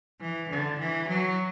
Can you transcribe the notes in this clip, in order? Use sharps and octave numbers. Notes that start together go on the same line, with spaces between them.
E3
D3
E3
F#3